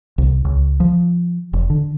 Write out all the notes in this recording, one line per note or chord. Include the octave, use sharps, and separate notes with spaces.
C2
C#2
F3
F1
D3